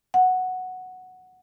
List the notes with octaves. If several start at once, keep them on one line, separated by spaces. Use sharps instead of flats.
F#5